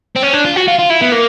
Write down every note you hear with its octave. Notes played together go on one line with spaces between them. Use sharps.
C4
C#4
D4
F4
F#4
F4
F4
E4
B3
A#3